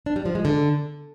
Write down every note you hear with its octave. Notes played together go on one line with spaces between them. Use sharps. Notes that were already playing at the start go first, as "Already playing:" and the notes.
D4
G3
F3
G#3
D3